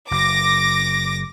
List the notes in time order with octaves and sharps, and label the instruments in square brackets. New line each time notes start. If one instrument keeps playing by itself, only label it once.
[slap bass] F#1 [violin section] D6 A#6